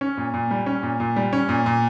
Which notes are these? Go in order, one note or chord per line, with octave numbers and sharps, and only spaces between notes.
C#4
A#2
A#2
G3
C#4
A#2
A#2
G3
C#4
A#2
A#2